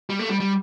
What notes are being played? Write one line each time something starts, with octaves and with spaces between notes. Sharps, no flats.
G3
A3
G3
G3